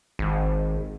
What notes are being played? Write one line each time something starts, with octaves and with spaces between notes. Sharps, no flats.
G#1